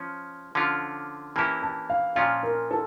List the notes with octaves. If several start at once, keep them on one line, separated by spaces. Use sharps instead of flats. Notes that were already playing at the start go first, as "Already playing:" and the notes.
Already playing: F3 C#4
D3 F3 C#4 F4
E3 A#3 C#4 E4 G4 A5
A5
F5
A#2 F3 C#4 F4 F5
A#4
A4